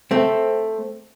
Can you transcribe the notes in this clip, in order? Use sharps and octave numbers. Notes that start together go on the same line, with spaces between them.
A3 C4